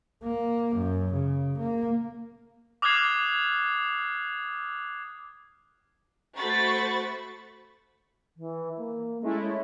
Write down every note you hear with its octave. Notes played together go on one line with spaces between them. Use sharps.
A#3
F#2
C#3
A#3
D6 D#6 F6 F#6 G#6 C7
A3 F#4 C5 B5 C#6 A6
E3
A#3
G#3 A3 C#4 E4
C#5